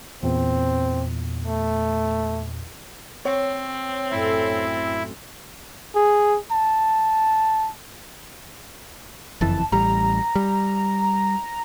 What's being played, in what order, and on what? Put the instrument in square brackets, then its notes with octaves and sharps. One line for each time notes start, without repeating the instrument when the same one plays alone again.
[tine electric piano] E2 A#2 [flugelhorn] C4
[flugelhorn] A3
[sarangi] C4 [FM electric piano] C#5
[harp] F#2 A2 A3 [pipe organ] E4
[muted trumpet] G#4
A5
[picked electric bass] F#1 F2 E3 [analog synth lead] A5
[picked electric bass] A1 G3 [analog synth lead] A#5
[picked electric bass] G3